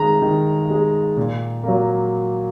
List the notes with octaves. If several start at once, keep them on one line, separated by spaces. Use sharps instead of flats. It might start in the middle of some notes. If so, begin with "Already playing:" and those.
Already playing: D#3 G#3 A#5
D#3
G#3
A#2
F#3 A#3